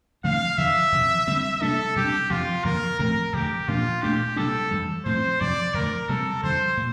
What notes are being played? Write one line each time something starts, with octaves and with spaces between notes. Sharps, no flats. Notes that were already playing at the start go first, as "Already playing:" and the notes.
D3 F3 A3 C4 F5
F2 D3 F3 E5
F2 C3 E3
D3 G3 C4
C3 G3 A#3 D4 A4
C3 G3 A#3 D4 G4
F2 C3 F3 F4
F2 D3 F3 A#3 A#4
A2 F3 A3 C4 A#4
F2 D3 A3 G4
A#2 F3 A#3 D4 F4
A#2 A3 D4 G4
C3 G3 A#3 D4 A4
F2 E3 G3
A2 F3 C4 C5
F2 C3 F3 D5
F2 D3 A3 A#4
C3 G3 C4 A4
F2 D3 G3 C5
A#2